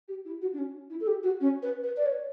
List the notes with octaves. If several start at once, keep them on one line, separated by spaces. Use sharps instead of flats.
G4
E4
F#4
D4
C#4
E4
A4
G4
F#4
C#4
B4
B4
D5
C#5